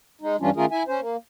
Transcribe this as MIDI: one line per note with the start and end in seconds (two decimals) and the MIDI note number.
0.22 0.36 56
0.22 0.36 63
0.41 0.50 43
0.41 0.50 52
0.41 0.50 55
0.41 0.50 61
0.41 0.50 62
0.41 0.50 65
0.56 0.65 51
0.56 0.65 57
0.56 0.65 61
0.56 0.65 65
0.56 0.65 68
0.56 0.65 70
0.71 0.83 64
0.71 0.83 76
0.71 0.83 80
0.88 1.00 61
0.88 1.00 72
1.00 1.17 58